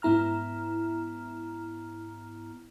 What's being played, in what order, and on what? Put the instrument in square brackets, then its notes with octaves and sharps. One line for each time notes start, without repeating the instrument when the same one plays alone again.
[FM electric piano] G#2 B3 E4 A#5 F6